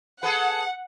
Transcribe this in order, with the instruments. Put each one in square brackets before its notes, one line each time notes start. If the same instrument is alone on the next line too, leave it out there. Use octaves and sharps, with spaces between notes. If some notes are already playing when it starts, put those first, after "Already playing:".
[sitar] G#4 A4 B4 [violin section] F#5